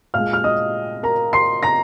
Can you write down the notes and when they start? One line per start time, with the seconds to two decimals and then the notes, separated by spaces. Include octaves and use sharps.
0.14 A#2 G#3 F5 F6
0.33 F6
0.44 D#5 D#6
1.03 A#4 A#5
1.33 C6 C7
1.63 A#5 A#6